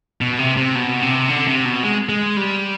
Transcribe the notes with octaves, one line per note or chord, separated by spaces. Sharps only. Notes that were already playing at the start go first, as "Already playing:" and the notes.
B2
C3
C3
B2
C3
D3
C3
B2
G#3
G#3
G3